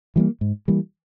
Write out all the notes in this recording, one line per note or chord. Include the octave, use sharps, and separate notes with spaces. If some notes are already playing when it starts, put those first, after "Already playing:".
E3 G3 A#3
G#2
E3 G3 A#3